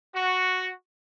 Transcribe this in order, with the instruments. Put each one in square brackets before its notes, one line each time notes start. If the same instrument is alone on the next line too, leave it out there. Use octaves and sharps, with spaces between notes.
[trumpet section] F#4